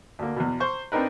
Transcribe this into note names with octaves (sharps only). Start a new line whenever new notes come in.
D2 A#3
E2 B2
C5 C#6
C4 D4 D#4 A#4 B4